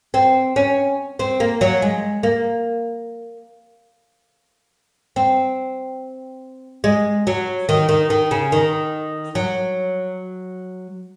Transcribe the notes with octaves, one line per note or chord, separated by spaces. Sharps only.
C4
C#4
C4
A#3
F#3
G#3
A#3
C4
G#3
F#3
D#3
D#3
D#3
C#3
D#3
F#3